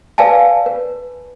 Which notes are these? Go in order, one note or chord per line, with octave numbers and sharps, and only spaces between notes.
B4 D5 F5 G#5 A5
B4